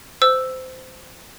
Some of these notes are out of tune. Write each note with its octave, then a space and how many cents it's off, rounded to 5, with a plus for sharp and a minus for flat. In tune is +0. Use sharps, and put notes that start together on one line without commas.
C5 -20 E6 +0